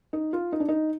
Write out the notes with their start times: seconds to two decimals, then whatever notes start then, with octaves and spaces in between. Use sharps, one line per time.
0.13 D#4
0.33 F4
0.52 D#4
0.60 D4
0.68 D#4